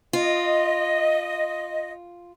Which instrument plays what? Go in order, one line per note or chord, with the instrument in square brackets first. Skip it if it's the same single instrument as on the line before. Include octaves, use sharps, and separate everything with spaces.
[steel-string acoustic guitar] F4 [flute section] D#5